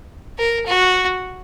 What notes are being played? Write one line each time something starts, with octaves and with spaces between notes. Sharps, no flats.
A#4
F#4